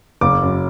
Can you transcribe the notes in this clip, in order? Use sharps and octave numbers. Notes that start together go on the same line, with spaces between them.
F#1 D6
F#2